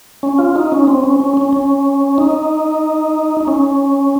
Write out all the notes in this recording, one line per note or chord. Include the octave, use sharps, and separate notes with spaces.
C#4
F4
D#4
C#4
C4
C#4
C#4
C#4
C#4
D#4
D#4
C#4